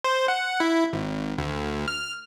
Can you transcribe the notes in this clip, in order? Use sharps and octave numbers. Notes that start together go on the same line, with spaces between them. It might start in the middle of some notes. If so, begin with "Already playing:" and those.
C5
F#5
E4
G#1
D2
F6